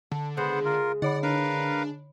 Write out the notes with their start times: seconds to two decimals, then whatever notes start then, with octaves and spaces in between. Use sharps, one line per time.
0.12 D3 A4
0.37 C#3 G#3 B3 C5 F#5
0.65 F4 A#4
1.02 D3 C#5 D5 F#5 B5
1.23 D4 A#4 B4 F5